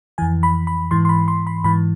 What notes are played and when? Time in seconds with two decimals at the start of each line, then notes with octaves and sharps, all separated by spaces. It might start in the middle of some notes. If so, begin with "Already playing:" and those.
0.18 F2 E3 G#5
0.43 B5
0.67 B5
0.91 G#2 E3 C6
1.05 C6
1.09 B5
1.28 C6
1.47 B5
1.64 G#2 E3 B5